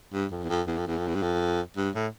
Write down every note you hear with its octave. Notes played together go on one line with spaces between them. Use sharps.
G2
F2
E2
F2
E2
F2
E2
F2
E2
G2
F2
G2
A2